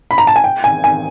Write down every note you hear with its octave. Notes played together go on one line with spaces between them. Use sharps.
B5
A#5
A5
G#5
G5
G#5
G#5